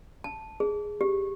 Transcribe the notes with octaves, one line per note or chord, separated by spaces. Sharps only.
A5
G#4
G4